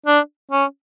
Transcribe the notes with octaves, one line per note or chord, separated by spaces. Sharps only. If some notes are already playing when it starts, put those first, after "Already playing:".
D4
C#4